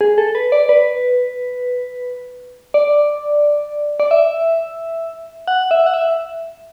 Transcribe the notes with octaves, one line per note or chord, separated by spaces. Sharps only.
G#4
A4
B4
D5
B4
D5
D5
E5
F#5
E5
F#5
E5